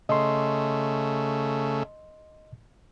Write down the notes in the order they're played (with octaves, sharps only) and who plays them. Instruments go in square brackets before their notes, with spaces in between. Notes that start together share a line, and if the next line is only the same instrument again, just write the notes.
[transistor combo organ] C#3 A3 [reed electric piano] D#5 C6